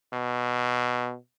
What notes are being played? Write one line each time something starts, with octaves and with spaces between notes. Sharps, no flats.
B2